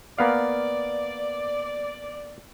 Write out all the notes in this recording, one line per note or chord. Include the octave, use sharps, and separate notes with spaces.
A#3 B3 D5 F5